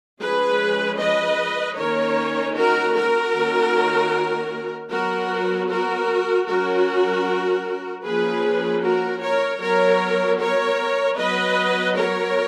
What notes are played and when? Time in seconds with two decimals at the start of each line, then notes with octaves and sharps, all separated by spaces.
0.20 F3 G#3 C#4 G#4 B4
0.99 B4 D#5
1.77 D#3 A#3 C#4 A#4 C#5
2.56 F#4 A#4
2.95 F#4 A#4
3.34 D#3 A#3 C#4
4.90 F#3 B3 F#4 A#4
5.69 F#4 A#4
6.47 F#3 C#4 F#4 A#4
8.04 F3 A#3 C#4 G#4 B4
8.83 F#4 A#4
9.21 A#4 C#5
9.60 F#3 B3 A#4 C#5
10.39 A#4 C#5
11.17 F#3 B3 B4 D#5
11.96 A#4 C#5